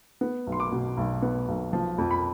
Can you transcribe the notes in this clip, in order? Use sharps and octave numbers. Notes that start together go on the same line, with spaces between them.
B3
B1
C6
D6
B2
B1
B3
B1
F3
F2
B5